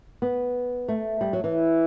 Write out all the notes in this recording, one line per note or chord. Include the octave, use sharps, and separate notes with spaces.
B3
A3
G3
F#3
E3